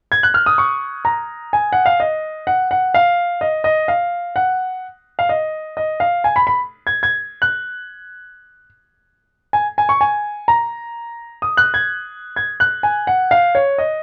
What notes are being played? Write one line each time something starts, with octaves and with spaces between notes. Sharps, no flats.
G#6
F#6
F6
D#6
C#6
A#5
G#5
F#5
F5
D#5
F#5
F#5
F5
D#5
D#5
F5
F#5
F5
D#5
D#5
F5
G#5
B5
B5
G#6
G#6
F#6
G#5
G#5
C#6
G#5
A#5
D#6
F#6
G#6
G#6
F#6
G#5
F#5
F5
C#5
D#5